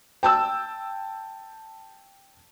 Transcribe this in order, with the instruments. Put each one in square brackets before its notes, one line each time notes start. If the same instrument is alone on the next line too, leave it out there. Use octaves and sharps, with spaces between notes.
[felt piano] G5 A5 E6